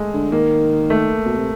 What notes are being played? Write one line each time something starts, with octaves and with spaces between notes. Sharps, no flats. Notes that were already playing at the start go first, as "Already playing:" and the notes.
Already playing: G#3 A3
D3
D#3 A#3
A3
B2
C3